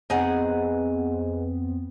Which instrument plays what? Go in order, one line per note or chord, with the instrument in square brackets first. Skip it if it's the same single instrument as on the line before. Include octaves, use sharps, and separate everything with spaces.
[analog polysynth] F2 B3 C4 [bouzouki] D#4 G#4 F#5